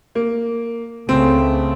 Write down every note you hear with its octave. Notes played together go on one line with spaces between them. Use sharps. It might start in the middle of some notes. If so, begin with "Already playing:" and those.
A#3
C#2 C#3 A3 C4